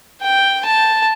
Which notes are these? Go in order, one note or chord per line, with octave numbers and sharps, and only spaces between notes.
G5
A5